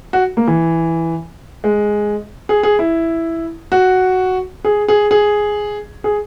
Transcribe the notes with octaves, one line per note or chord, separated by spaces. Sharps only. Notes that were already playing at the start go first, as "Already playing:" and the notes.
F#4
A#3
E3
G#3
G#4
G#4
E4
F#4
G#4
G#4
G#4
G#4